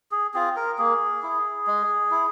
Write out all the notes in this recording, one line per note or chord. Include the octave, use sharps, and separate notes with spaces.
G#4
C4 F4 G#4
A#4
A#3 G#4
E4
G#3
E4